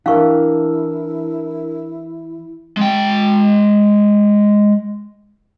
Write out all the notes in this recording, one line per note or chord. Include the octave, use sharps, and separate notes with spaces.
E3 D4 E4 G4 A#4 F5 C#6
G#3 G5